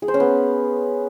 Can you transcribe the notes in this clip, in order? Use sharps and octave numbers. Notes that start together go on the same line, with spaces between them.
G#4
C5
C#4
B3